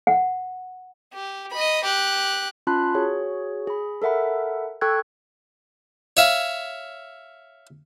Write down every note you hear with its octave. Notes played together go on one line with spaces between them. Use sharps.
F#5
G4
D#5 B5
G4 F#6
C#4 F4 A5 B5 C6 F#6
F#4 G#4 C#5
G#4 B5
A4 A#4 E5 F#5 B5
A4 G5 C#6 E6 F#6 G#6
C#5 E5 F5